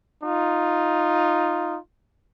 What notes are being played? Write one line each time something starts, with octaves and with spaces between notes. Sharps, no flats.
D#4 F4